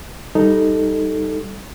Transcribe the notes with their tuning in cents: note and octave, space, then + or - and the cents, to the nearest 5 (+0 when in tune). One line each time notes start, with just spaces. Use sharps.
G3 +5 D#4 +0 A4 +0